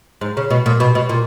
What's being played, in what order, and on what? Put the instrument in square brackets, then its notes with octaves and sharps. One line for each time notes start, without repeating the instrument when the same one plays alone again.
[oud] G#2
C#3
B2
A#2
B2
B2
A#2